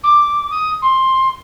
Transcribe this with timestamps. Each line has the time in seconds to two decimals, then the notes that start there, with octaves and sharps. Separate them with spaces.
0.03 D6
0.50 D#6
0.82 C6